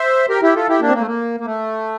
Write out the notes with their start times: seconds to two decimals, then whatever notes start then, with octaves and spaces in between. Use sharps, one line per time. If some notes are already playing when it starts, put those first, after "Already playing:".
Already playing: C5 E5
0.29 G4 A#4
0.42 E4 G4
0.55 F4 A4
0.69 E4 G4
0.81 A#3 D4
0.88 C4
0.94 A#3
1.00 A3
1.07 A#3
1.40 A#3
1.46 A3